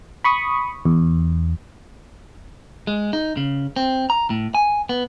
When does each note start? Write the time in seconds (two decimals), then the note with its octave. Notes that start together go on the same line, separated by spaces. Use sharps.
0.24 B5 C#6 D#6
0.85 E2
2.87 G#3
3.13 D#4
3.37 C#3
3.76 C4
4.10 A#5
4.30 A2
4.55 G#5
4.89 B3